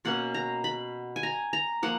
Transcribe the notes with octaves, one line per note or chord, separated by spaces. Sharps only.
B2 A#3 C#4 F#5
A#5
B5
G#5
A#5
A#5
F3 A#3 F#5